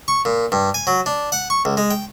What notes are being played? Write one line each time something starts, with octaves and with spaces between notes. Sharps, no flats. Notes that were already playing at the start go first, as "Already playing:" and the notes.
C#6
A#2
G2
G#5
F#3
D4
F#5
C#6
C#2
G#3
G5